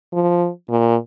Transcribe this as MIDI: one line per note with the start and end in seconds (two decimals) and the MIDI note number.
0.13 0.49 53
0.69 0.96 46